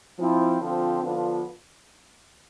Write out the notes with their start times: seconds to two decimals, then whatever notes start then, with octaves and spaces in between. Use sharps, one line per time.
0.19 F3 C4 E4
0.60 D3 F3 C4 F4
1.02 D3 F3 B3 D4 F4